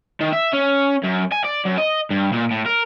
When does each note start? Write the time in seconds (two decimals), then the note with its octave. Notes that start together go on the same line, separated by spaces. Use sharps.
0.21 D#3
0.33 E5
0.53 C#4
1.03 F#2
1.32 G#5
1.45 D5
1.66 F#2
1.78 D#5
2.10 G2
2.33 A#2
2.51 A2
2.66 A#4